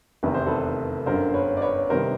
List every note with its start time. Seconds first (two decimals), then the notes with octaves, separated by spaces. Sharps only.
0.23 F1 E2 C3 D#3 B4
0.34 C5
0.46 A4 B4
1.06 G1 F#2 D3 A#4 C5
1.29 C5
1.34 B4 C#5
1.57 D5
1.62 B4 C#5
1.90 C3 D#3 G3 B3 A#4 C5